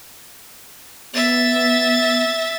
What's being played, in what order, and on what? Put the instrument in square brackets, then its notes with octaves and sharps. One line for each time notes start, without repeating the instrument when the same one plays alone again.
[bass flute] B3 [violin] E5 A6